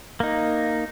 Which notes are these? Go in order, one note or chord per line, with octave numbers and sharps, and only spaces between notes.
A#3 D#4